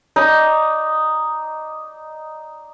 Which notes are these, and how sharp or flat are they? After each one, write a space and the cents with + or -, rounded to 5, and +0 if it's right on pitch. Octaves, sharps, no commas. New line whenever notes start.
D#4 +0 D5 -5